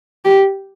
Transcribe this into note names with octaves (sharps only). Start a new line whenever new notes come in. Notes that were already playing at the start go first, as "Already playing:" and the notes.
G4